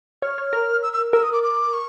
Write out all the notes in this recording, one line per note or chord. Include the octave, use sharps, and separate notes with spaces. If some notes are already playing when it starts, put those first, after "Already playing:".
C#5 F6
C#5
A#4
E6
E6
A#4 E6
D#6
D6
D6
C#6